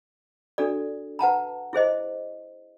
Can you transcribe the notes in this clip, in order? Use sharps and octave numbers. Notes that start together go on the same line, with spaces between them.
D4 F#4 A4 D5
B4 F#5 A5 A#5
E4 G#4 C5 D#5